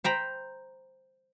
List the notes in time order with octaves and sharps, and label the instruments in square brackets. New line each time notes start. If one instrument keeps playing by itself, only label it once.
[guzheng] C5 G5 A#5 B5